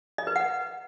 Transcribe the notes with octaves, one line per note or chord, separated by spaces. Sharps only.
D#5
B4
F#5